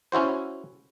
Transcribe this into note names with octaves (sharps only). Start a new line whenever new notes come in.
C#4 E4 F#4 C5